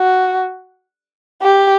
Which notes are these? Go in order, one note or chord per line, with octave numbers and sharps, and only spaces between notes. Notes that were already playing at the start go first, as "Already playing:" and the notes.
Already playing: F#4
G4